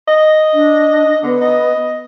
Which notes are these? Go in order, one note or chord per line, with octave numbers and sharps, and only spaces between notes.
D#5
D4
D3 B3
D#5